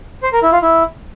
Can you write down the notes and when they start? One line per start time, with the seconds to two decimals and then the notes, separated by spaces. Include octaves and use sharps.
0.23 C5
0.33 A#4
0.43 E4
0.52 F4
0.62 E4